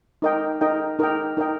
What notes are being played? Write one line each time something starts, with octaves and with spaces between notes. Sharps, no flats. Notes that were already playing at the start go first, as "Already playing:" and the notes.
D#4 A#4 D#5 G5
D#4 A#4 D#5 G5
D#4 A#4 D#5 G5
D#4 A#4 D#5 G5